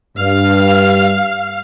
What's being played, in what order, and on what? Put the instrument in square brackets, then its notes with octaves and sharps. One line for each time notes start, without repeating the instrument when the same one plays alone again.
[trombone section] G2 [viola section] F5